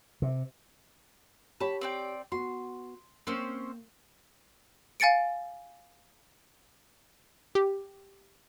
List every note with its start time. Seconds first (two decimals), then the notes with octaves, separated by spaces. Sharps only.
0.22 C3
1.60 G4 C#5 A5 B5
1.81 C4 D5 G5
2.32 B3 F#4 C6
3.27 A#3 C4 C#4 C5
5.00 F5 G#5 A6 C#7 D7
7.55 G4